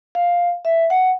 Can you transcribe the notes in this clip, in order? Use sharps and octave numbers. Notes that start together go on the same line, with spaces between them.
F5
E5
F#5